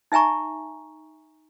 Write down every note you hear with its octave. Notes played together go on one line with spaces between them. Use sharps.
D#4 E5 G#5 A#5 C#6